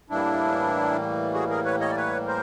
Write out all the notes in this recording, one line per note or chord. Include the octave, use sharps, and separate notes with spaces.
A2 E3 G3 A#3 D4 E4
F#4 G#4
G#4 A#4
B4 C#5
C#5 D#5
D5
B4 C#5
A#4 C5